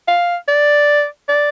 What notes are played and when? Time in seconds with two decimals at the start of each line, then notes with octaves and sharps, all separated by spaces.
0.08 F5
0.48 D5
1.29 D5